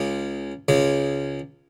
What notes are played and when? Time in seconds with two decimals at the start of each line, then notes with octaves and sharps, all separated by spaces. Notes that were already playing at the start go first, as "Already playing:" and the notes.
Already playing: C#2 C#3 G#3
0.68 C#2 C#3 G#3